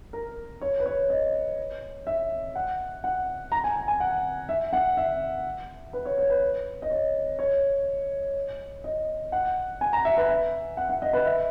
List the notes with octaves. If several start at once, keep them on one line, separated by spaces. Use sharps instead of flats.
A#4
C#5
B4
C#5
D#5
E5
F#5
F#5
A#5
G#5
G#5
G#5
F#5
E5
F#5
E5
B4
C#5
C#5
B4
D#5
C#5
C#5
D#5
F#5
G#5
A#5
E5
B4
E5
F#5
F#5
D#5
B4
E5